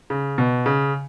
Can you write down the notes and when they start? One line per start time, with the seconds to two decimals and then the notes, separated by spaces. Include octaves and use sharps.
0.10 C#3
0.38 B2
0.66 C#3